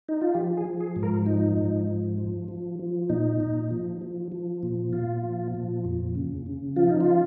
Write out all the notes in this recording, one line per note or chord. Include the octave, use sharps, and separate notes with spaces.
D#4
F4
F3 G4
G#4
F3
G#4
G#2
A#4
F3 D#4
G#2
F3
F3
F3
F3
A#2 D#4
A#2
F3
F3
F3
A#2
A#2 F4
F3
A#2
F2
C#3
C#3
F3 F4
D#4
F4